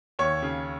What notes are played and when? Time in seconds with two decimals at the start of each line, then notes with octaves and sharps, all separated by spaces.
0.19 D#2 C#5
0.43 C#3